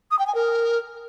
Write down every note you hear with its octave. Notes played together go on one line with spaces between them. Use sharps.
D#6
G5
G#5
A#4